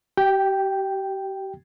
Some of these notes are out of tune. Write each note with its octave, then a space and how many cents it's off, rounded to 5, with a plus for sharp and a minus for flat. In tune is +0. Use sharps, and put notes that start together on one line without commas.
G4 -35 G5 +0